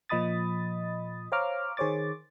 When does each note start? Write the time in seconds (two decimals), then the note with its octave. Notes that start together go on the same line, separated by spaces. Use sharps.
0.09 A#2 F3 D#5 B5 D#6 A6
1.32 C5 C#5 F5 A#5 D6 F6
1.77 D#3 G#4 C5 C#5 D6 A6